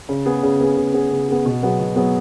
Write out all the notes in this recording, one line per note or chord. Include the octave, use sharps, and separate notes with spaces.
C#3
B3 G#4
C#3
B3 G#4
C#3
B3 G#4
C#3
B3 G#4
B2
F#3 B3 G#4
B2
F#3 B3 G#4